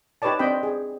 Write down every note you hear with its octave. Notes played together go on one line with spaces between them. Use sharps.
D#4 G4 B4 C#5 D5 A5
C4 D4 D#5 G5 B5
G#4